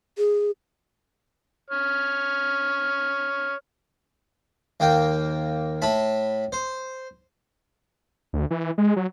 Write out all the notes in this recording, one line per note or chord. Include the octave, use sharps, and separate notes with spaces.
G#4
C#5 F6
D#2 A#3 G5
A2 A5 B5
C5
D2
E3
G#3
F#3